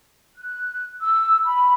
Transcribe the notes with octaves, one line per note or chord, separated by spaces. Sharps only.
F#6
E6
B5